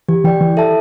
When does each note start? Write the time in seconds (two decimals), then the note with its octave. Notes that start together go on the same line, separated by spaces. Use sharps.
0.09 E3 G4
0.24 E3 D5 G5
0.41 E3 E4
0.57 A4 E5 A5